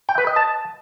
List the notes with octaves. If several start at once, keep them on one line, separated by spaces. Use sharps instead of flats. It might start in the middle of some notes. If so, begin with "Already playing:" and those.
G5
B4
D#5
A5